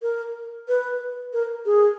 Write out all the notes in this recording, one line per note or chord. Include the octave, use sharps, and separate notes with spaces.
A#4
B4
A#4
G#4